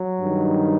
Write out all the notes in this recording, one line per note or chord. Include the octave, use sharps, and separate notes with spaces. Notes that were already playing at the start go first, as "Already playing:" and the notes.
Already playing: F#3
G2 D#3